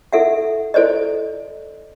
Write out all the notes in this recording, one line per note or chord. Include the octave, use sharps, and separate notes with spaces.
E4 A4 E5 F#5
E4 A4 C5 D5 D#5